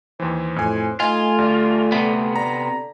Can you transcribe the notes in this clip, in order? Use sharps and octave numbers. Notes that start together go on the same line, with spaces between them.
D#2 E3 C5
F2 A2 G#5
A3 D#4 F4 G#5
D2 G3
C3 B3
D3 A#5